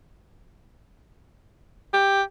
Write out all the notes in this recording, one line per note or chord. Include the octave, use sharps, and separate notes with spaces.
G4